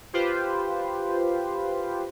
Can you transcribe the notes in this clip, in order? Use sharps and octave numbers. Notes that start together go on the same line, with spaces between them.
F4 G4 B4 C5